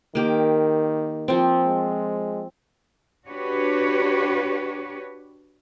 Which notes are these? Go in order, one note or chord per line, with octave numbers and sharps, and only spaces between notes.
D#3 A#3 G4
F3 C4
G#3
D4 F#4 G4 B4 C#5